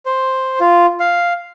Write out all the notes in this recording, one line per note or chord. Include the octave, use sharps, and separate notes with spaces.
C5
F4
F5